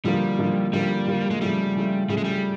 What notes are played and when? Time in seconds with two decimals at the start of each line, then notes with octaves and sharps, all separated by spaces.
0.04 D3 F3 G3 A#3
0.39 D3 F3 A#3
0.73 D3 F3 G3 A#3
1.07 D3 F3 A#3
1.31 G#3
1.41 C#3 F3 G3 A3
1.75 C#3 F3 A3
2.09 C#3 F3 G3 A3
2.18 G#3
2.25 G3